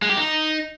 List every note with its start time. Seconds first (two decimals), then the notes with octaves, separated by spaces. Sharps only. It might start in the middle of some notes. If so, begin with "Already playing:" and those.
0.02 G#3
0.10 G4
0.17 D#4